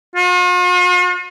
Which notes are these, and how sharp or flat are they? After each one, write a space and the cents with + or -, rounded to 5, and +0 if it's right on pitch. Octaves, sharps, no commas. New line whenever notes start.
F4 +45